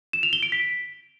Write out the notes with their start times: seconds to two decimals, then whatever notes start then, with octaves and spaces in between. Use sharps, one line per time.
0.13 E7
0.23 F7
0.33 G7
0.43 D7
0.52 B6